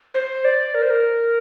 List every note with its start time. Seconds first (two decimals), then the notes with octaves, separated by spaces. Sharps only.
0.14 C5
0.45 D5
0.74 A#4
0.82 C5
0.90 A#4